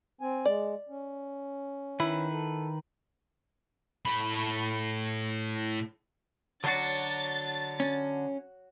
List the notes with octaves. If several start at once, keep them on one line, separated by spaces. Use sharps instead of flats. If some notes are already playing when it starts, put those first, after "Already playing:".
C4 G#5
G#3 D5
C#4
D#3 E4 B4
A4
A2 B5
D3 F#3 D4 F#4 A6
C#4